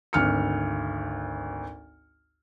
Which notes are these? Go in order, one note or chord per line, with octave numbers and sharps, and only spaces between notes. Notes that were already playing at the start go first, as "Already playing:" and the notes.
G#1 D2 F6 C#7